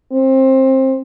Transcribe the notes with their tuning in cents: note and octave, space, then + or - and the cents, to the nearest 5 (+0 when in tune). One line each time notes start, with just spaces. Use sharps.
C4 +20